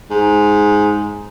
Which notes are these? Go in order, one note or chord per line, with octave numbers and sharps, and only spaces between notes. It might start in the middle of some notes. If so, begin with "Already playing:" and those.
G#2